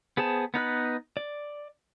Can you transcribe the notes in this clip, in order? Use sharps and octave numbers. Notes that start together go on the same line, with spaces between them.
B3 G#4 C5 A5
B3 D#4 B4 F#6
D5